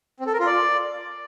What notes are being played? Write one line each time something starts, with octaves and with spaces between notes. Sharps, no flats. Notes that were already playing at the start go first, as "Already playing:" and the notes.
C4
A4
A#4
F4
D5